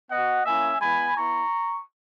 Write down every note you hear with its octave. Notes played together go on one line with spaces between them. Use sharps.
B3 F#4 D#5 F#5
A#3 C#4 E4 E5 G#5
G#3 B3 E4 G#5 B5
B3 E4 A#5 C#6